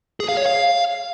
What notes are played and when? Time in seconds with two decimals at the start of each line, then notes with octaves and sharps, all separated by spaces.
0.20 G#4
0.29 F5
0.37 C#5
0.46 F5